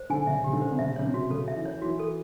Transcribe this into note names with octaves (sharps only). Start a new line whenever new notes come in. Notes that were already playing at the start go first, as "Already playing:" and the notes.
Already playing: C5
D3 G#5
C#3 E5
C#3 G4
D3
C5
C3
C#3 E5
C#3 C#5
C3
F#4
C#3 A4
E5
E3
C#5
E3 F#4
A4